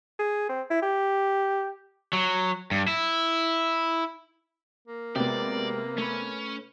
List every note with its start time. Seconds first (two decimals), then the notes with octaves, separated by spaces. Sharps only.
0.19 G#4
0.49 C4
0.70 E4
0.82 G4
2.13 F#3
2.71 G2
2.88 E4
4.88 A#3
5.16 C3 G#3 B3 F#4 G4 D5
5.98 A3 C#4 B4